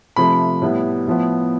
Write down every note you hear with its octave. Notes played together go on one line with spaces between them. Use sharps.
C3 F3 A3 B5
A2 G3 B3
A2 F3 B3